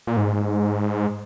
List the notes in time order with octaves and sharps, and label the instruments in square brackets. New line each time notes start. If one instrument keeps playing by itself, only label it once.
[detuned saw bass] A#2
G#2